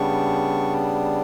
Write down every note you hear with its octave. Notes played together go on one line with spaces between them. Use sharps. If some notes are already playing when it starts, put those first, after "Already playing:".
Already playing: C#3 G3 B3 D4 C#6